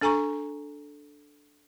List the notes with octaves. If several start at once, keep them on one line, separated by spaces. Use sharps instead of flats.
D4 A4 G#5 A#5 C#6